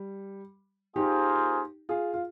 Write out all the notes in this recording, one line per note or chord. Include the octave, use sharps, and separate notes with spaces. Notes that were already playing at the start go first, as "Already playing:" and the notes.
Already playing: G3
A#3 D#4 F4 G4 G#4 C5
F4 G#4
F4